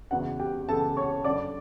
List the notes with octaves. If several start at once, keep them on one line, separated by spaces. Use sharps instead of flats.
E2 C#3 E3 F#4 F#5
G4 G5
E2 C#3 E3 A4 A5
C#5 C#6
F#2 D3 D5 D6